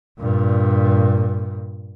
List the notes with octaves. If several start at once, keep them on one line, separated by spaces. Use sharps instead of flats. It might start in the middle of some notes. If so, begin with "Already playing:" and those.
G2 A#2